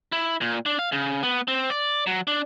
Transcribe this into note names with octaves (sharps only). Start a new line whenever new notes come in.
E4
A#2
D4
F5
C#3
B3
C4
D5
F#3
D4